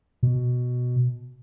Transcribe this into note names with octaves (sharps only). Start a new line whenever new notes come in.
B2